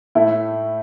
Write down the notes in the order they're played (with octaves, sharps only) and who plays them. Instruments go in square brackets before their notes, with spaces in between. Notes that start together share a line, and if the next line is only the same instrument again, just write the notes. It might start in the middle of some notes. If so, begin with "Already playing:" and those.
[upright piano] A2 A3 E4